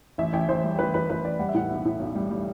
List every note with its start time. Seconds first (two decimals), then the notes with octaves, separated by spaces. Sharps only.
0.18 A1 E5
0.33 A1 G5
0.48 A1 C5
0.64 G3
0.79 A1 B4
0.94 A1 B4
1.09 A1 B4
1.24 A1 D5
1.39 G3 F#5
1.49 E5
1.54 A2 F#5
1.70 B1
1.85 A2
2.00 B1
2.15 G3
2.30 G3